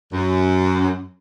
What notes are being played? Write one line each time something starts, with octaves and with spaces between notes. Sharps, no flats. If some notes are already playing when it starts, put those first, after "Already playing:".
F#2